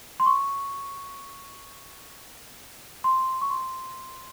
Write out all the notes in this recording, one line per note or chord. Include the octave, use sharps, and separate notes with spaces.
C6
C#6
C6
C#6
C6